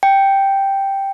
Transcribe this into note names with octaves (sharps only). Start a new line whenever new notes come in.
G5